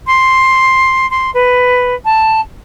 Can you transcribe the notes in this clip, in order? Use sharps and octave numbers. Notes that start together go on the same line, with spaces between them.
C6
C6
B4
A5